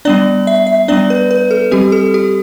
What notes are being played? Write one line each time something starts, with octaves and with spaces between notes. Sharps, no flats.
G3 B3 D4 D5
E5
E5
G3 B3 D4 D5
B4
B4
A4
G3 C4 G4
A4
G4